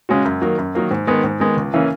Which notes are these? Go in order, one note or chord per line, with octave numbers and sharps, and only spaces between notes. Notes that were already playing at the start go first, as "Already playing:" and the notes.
C#3 G#3 C#4 F#4
F#2
D#3 F#3 A#3
F#2
D#3 F#3 A#3
G#2
D#3 G#3 B3
G#2
D#3 G#3 B3
C#2
C#3 E3 A#3 C#4